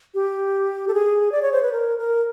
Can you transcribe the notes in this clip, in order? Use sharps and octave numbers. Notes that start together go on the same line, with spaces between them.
G4
A4
G#4
D5
C#5
C5
B4
A#4
A#4